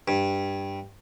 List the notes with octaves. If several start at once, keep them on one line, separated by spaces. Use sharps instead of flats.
G2